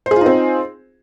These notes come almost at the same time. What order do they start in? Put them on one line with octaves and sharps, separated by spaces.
C5 G#4 F4 D#4 C4